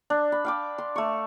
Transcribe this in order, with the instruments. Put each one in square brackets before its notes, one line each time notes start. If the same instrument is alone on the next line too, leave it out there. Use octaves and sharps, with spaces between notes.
[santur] D4
B5
F5 G5 D6
C6
A3 C#6